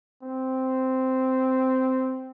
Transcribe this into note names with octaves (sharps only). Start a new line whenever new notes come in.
C4